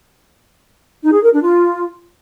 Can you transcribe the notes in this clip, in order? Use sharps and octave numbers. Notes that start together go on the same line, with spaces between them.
D#4
G#4
A#4
D4
F4